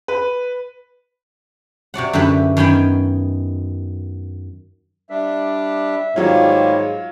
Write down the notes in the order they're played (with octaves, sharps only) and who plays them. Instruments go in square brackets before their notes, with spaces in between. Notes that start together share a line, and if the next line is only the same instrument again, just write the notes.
[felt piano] B4
[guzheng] C3 F#4 D5 F#5
F#2 D3 E4 G4 B4 B5
F#2 D#3 B3 G5 G#5 B5
[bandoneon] G3 D4 [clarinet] E5
[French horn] G#2 [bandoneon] D#3 G3 A#3 [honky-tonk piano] F#3 F4 [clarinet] C#5